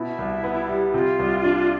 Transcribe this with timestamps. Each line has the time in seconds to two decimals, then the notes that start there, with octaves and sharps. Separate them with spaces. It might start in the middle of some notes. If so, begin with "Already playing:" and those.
Already playing: B2 E4
0.19 C2
0.44 B3
0.68 G3
0.94 C3 F4
1.19 C2
1.44 D4